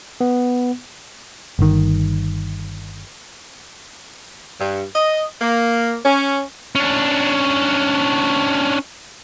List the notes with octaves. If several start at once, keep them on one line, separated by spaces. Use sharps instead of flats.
B3
G1 D#3
G2
D#5
A#3
C#4
C#4 D4